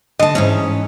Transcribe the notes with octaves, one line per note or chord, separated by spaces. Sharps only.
D3 D#5 A5
G#2 E3 C#4